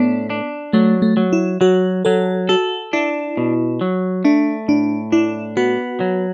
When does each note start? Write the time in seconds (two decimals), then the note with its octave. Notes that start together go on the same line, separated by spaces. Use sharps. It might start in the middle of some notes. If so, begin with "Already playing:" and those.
Already playing: A2 B3 D4
0.30 D4
0.73 F#3 A3
1.02 A3
1.17 F#3
1.33 E4
1.61 F#3 F#4
2.05 F#3 A4
2.49 F#4 A4
2.93 D4 E4
3.37 B2
3.81 F#3
4.25 A3 D4
4.68 A2 D4
5.12 D4 E4
5.57 B3 F#4
6.00 F#3